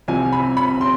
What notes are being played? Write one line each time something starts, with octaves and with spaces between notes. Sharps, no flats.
C2 C3 F3 G#5
B5
B5
C6